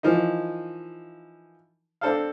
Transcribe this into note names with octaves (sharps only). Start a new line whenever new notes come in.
E3 F3 A#3 D#4
C4 D4 A4 C5 F5